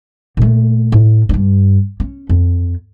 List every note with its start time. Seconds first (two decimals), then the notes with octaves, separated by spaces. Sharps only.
0.37 A#2 A3
0.92 A2
1.29 G2 D4
2.00 C#4
2.29 F2